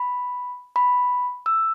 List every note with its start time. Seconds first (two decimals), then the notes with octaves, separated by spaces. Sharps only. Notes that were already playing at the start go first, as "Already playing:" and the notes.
Already playing: B5
0.76 B5
1.46 E6